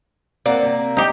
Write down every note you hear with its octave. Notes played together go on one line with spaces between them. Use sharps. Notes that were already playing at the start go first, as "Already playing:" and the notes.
A#3 C4 A#4 D5 F#5
C3
D#4 G4